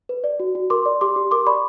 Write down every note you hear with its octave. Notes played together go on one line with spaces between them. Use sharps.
B4
D5
F#4
F#4
A#4 C6 D6
D5
G4 C6 D6
G4
A#4 C6 D6
D5 B5 C#6